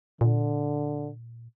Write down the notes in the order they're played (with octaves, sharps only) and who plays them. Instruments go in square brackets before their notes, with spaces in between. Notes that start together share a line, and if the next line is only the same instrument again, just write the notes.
[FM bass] A#2 [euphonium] D3